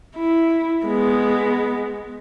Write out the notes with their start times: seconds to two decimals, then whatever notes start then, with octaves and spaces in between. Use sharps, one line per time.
0.16 E4
0.86 G#3 B3